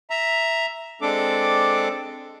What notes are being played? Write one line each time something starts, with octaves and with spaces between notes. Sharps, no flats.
E5 A#5
G#3 C4 D4 A4 D6